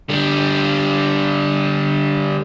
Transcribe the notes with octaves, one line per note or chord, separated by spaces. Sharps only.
D3 G3